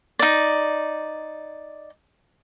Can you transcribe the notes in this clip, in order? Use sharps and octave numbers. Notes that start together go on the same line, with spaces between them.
D#4 D5